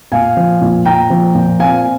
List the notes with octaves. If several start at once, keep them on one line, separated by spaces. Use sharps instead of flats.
A#2 F5 G#5
F3
A#2
A#2 G5 A#5
F3
A#2
C4 F5 G#5